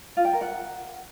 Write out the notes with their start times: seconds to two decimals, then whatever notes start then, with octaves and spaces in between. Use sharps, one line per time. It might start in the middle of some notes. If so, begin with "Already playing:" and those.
0.17 F4
0.25 G5
0.33 A#4
0.41 F#5